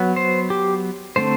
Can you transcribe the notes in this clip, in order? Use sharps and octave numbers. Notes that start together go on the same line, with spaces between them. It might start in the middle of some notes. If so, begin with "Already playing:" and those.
Already playing: F#3 B3
C5
G4
D3 A3 C4 C5